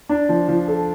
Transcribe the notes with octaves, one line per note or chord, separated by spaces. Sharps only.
D4
F3
F3
A4